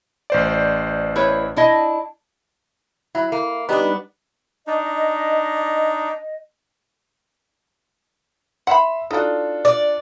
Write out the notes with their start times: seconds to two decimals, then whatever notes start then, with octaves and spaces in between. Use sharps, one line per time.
0.30 A1 C5 D5
1.16 E4 B4 C#5
1.56 D4 E4 D#5
3.15 F#3 E4
3.32 A#3
3.69 G3 B3 D4 D#4 B4
4.67 D4 D#4 D#5
8.67 E5 F#5 B5 C6
9.11 D4 D#4 F4 F#4 A4
9.65 D5